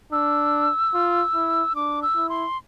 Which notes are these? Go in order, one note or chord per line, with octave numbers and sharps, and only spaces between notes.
D4 E6
F4
E4
D4 D6
E6
E4
C6